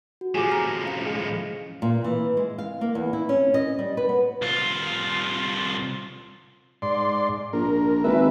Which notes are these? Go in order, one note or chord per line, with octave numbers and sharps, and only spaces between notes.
F#4
A2 F3 F4 G4 G#4 D6
A#5 F6 A#6
C#4 F5 C#7
G#3
A#2
E3
G#3
F5
A#3
E2
E4
C#4
D#5
G3
B4
B3
C2 F4
G#2 D5 C6
A#1 A#4
G#1 B4 E5